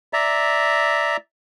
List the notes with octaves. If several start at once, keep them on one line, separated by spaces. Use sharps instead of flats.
D5 E5 A#5